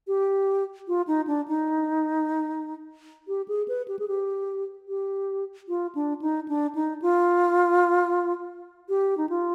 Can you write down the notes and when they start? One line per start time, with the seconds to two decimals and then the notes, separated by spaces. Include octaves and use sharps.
0.07 G4
0.88 F4
1.07 D#4
1.27 D4
1.48 D#4
3.28 G4
3.48 G#4
3.68 B4
3.88 G4
3.99 G#4
4.08 G4
4.88 G4
5.68 F4
5.95 D4
6.22 D#4
6.48 D4
6.75 D#4
7.02 F4
8.89 G4
9.17 D#4
9.29 F4